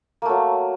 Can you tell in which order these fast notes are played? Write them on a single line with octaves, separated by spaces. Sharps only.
A#3 A3 F#3